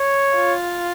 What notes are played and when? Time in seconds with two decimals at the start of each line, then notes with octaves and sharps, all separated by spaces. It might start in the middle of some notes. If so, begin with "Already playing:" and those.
Already playing: C#5
0.36 F4